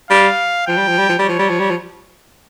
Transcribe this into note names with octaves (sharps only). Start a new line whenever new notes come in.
G3 F5
F3 G5
G3
F3
G3
F3
G3
F3 C#5
G3
F3
G3
F3